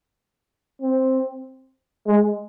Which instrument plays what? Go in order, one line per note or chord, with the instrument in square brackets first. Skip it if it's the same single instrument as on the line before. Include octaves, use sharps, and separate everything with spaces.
[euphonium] C4
G#3